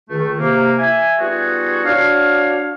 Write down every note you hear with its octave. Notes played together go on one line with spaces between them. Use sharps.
C#2 D#3 A3
C3 A#3
E5 G#5
G3 B3 D#4 F4 F#4 G#4
D4 F#4 C#5 F5